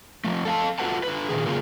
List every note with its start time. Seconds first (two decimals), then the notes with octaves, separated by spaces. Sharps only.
0.24 F3 A3
0.45 A4 F5 A5
0.79 F4 F#4 A4 B4 F#5 A5
1.03 D3 B4
1.29 A#2 D#3 G#4
1.46 C#3 F#3 A#3 F4 G#4 A#4